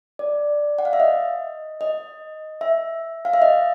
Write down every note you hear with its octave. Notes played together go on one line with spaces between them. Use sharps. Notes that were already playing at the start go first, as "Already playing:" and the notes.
D5
F#5
F5
E5
D#5
D#5
E5
F5
E5
D#5